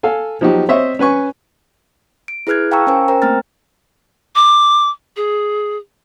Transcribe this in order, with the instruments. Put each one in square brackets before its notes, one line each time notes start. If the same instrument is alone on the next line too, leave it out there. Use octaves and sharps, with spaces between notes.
[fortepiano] A4 F5 G#5
F3 F#3 D#4 F#4 G4
C4 C5 C#5 D#5 E5
C#4 B4 G#5 C#6
[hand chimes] D7
E4 G#4 B4 F6 F#6 G#6
F5 G5 A5 A#5 C#6 E6
C#4 A#4 C5 G5 G#5
A#4 C5 G5 A#5
A3 A#3 C4 A#5 F6 A6
[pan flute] D6
G#4